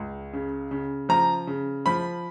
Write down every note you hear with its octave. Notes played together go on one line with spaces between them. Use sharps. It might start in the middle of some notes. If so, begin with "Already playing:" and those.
Already playing: C#2 G#3
C#3
C#3
F3 A#5
C#3
F3 B5